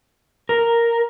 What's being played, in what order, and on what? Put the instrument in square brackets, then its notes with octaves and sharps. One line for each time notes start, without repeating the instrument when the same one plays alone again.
[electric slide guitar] A#4